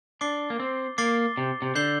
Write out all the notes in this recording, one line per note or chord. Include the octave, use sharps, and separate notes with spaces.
D4 D6 A6 C7 G7
A#3
C4
A#3 D6 A6 C7 G7
C3
C3
D3 G6 C7 G7